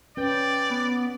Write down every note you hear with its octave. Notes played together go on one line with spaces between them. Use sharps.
C#4 B4 D5 G5
B3